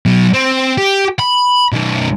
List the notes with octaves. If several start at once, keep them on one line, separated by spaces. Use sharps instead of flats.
B2 F#3
C4
G4
B5
B1 D#3